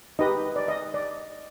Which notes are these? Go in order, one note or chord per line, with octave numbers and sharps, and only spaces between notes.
D#4 G4 B4 D#5
D5
D#5
D5